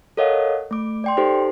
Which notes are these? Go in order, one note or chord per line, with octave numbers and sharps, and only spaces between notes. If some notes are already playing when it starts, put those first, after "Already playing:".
A4 A#4 C#5 D#5 F5 F#5
A3 D6
D5 G5 C6
D#4 G4 A4 C5